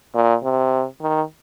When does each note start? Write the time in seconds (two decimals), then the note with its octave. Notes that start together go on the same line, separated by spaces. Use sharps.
0.15 A#2
0.43 C3
1.01 D#3